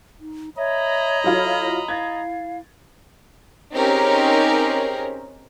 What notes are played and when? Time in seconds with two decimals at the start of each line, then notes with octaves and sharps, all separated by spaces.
0.21 D#4
0.57 C#5 D#5 E5 A#5 B5
1.24 F#3 E4 F4 A4
1.88 E4 F5 G#6 A6
3.73 C4 C#4 D#4 G4 G#4 A#4